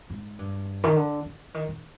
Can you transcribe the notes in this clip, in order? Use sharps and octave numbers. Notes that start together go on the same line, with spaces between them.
G#2
G2
D#3
D3
D3
D#3
D#3